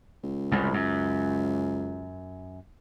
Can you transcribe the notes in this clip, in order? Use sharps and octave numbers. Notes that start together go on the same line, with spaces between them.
C#2
C2 F#2
F#2